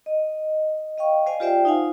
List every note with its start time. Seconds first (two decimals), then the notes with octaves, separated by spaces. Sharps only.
0.06 D#5
0.98 D#5 F5 G5 C#6
1.26 C5 D5 D#5 F5 G#5
1.40 F4 G4 C5 D5 E5 G5
1.65 D#4 F4 C5 F5 F#5 G#5